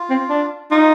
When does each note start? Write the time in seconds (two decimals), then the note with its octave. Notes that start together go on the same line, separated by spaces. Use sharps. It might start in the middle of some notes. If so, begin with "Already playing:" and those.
Already playing: F4
0.10 C4
0.30 D4
0.71 D#4 F4